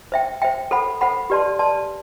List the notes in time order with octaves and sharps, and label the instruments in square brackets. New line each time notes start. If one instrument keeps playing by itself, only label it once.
[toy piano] C5 E5 G5
C5 E5 G5
A4 C5 F#5 B5
A4 C5 F#5 B5
G4 B4 D5 A5 C6
G4 B4 D5 A5 C6